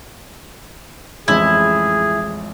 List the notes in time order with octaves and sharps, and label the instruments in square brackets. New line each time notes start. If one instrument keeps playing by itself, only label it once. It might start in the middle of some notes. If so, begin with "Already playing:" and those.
[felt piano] A1 F2 G#3 [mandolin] E4 [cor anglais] G#4